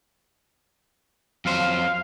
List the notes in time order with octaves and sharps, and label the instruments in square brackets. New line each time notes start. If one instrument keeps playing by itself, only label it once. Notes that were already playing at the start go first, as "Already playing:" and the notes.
[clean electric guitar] F2 F#3 C5 [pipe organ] F5